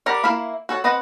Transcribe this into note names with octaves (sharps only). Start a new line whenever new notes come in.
G3 G4 A#4 D5 F#5
A#3 E4 E5 F5 B5
F#4 A4 C#5
C4 B4 D#5 F#5